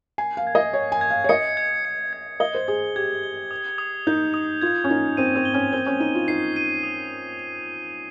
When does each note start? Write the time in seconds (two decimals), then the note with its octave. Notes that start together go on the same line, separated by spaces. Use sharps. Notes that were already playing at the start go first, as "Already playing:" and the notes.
0.18 G#5 C7
0.37 F5
0.47 G#6
0.55 D#5
0.73 C#5 G#6
0.92 G#5
1.01 G#6
1.10 F5
1.24 C#5
1.29 D#5 C#7
1.57 G#6
1.85 C#7
2.13 G#6
2.40 D#5 G7
2.55 C5
2.68 G#4 G#6
2.96 G4 G#6
3.23 G7
3.51 D#6
3.78 D#6
4.07 D#4 G6
4.34 D#6
4.61 F4 G#6
4.84 C#4
4.89 D#4 G#6
5.17 C4 D#7
5.36 C4
5.45 G7
5.54 C#4
5.73 C4 G7
5.86 C#4
6.00 D#4 D#7
6.15 F4
6.28 D#4 C7
6.56 D#7
6.83 D#6